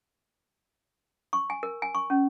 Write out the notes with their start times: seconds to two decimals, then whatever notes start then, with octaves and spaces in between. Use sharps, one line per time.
1.33 C#6
1.50 G#5
1.63 A#4
1.82 G#5
1.95 C#6
2.10 C#4